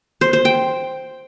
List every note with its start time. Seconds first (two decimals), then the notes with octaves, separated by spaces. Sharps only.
0.21 C5
0.33 C5
0.45 G5